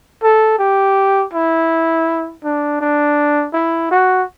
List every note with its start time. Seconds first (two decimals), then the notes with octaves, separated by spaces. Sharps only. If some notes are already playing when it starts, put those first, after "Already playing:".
0.23 A4
0.59 G4
1.34 E4
2.44 D4
2.81 D4
3.54 E4
3.91 F#4